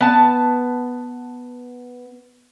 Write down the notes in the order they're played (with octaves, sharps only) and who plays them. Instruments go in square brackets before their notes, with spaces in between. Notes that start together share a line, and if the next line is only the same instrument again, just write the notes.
[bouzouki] B3 A5